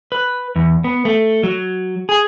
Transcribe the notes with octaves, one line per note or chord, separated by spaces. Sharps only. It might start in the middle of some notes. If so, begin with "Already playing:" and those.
B4
E2
B3
A3
F#3
G#4